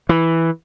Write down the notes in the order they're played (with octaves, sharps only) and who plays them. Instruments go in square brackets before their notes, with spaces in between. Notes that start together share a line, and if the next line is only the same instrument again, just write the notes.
[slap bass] E3